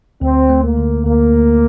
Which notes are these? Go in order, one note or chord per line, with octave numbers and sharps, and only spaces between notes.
D2 C4
A3
A#3
D3
D2 A#3
D2